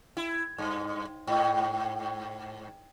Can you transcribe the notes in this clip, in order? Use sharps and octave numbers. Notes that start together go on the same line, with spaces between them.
E4
G2
G#2